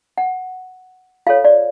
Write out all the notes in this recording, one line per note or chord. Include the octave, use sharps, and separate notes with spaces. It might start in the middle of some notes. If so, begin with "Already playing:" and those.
F#5
F4 A4 C#5 F5
D5